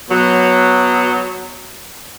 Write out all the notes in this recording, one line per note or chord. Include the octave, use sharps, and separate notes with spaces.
B2 F#3